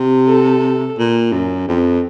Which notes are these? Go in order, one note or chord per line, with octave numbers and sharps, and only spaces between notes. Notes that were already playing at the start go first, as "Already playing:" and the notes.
Already playing: C3
A4
A#2
F#2
F2